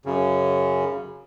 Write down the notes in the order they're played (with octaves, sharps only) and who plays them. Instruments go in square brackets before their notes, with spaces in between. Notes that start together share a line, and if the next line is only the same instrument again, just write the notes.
[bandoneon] F#2 C#3